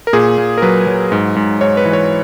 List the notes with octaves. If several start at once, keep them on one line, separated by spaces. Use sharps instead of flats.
A#4
A#2 G#4
A#2
A#4
F#3 B4
F#3
G#2
G#2
G#2 C#5
B4
E3
C#5